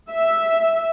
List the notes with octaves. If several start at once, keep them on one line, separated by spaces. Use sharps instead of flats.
E5